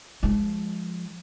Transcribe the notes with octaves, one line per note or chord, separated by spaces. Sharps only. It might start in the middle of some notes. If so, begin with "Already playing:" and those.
F3 G#3